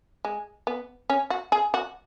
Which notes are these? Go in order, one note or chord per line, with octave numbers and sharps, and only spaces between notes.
G#3
B3
C#4
F#4
G#4
F#4